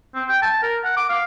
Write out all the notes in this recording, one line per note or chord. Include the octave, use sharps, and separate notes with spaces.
C4
G5
A5
A#4
F#5
D6
F5